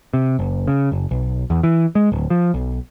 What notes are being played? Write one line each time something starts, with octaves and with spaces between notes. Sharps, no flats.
C3
F#1
C#3
F#1
B1
E2
E3
G#3
D1
F3
B1